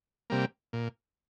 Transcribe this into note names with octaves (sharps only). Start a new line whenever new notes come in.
C3 G3 A#3
A#2